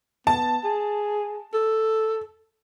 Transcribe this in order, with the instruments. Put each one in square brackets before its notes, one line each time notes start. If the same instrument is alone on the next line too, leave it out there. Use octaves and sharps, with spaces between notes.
[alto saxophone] B3 [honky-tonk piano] A5
[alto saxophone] G#4
A4